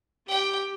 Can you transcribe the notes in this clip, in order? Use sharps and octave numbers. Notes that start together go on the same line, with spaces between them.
G4 G5